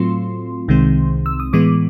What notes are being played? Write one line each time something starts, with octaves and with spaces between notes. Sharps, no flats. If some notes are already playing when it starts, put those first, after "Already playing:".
Already playing: A2 F#3 A3 C4 F4 C6
C2 C3 D#3 G#3 C4
E6
D#6
A2 E3 G#3 B3 D6